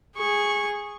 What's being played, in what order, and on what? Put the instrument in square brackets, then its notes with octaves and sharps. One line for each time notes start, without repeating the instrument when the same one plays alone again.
[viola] G#4 C#6